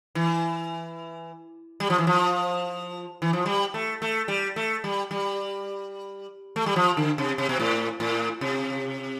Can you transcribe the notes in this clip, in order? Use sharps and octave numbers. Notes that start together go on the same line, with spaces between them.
E3
G3
F3
E3
F3
E3
F3
G3
A3
A3
G3
A3
G3
G3
A3
G3
F3
D3
C3
C3
B2
A2
A2
C3